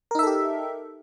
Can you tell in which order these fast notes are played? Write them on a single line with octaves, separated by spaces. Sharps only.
A#4 D#4 E5 A4 G4